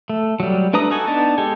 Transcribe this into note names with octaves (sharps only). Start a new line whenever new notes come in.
A3
F#3 G3
A3 D4 B4 A#5 D#6
D#4 F#4 A4 G#5
B3 D4 D#4 A5
G#3 G4 A4 G#5